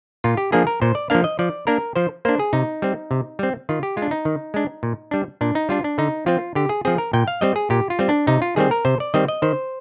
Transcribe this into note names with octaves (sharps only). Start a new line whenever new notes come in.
A#2 F4
G4
F3 A#3 D4 G#4
A#4
A#2 C5
D5
F3 A#3 D4 F5
D#5
F3 D5
A#3 D4 A#4
F3 C5
A#3 D4 C5
G#4
C3 D#4
G3 C4
C3
G3 C4
D#3 F4
G4
G#3 F4
D4
D#4
D#3
G#3 D4
A#2
G3 D4
A#2 D4
D#4
G3 D4 F4
D4
D3 D#4
F3 C4 F4
D3 G4
G#4
F3 C4 G#4
A#4
A#2 G5
F5
G3 C4 D#5
G#4
A#2 G4
F4
G3 C4
D4
C3 D#4
F4
D#3 G3 C4 G#4
A#4
C3 C5
D5
D#3 G3 C4 D#5
D#5
D#3 C5